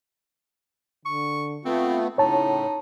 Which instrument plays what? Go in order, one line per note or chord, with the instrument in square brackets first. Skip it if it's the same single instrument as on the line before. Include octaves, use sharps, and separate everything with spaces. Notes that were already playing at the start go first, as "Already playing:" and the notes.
[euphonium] D3 [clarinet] C#6
[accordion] A3 B3 [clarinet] C4 [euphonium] F4
[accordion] A2 [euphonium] C#3 [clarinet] D#4 [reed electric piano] C#5 A5